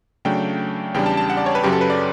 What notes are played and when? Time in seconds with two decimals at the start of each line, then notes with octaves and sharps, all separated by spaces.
0.25 C#3 F#3 A3 D4 G5
0.94 E2 C#3 G3 D4 G5
1.06 A5
1.17 A5
1.30 F#5
1.37 D5
1.46 C#5
1.55 B4
1.64 F#2 C#3 F#3 G4
1.72 A4
1.81 B4
1.90 D5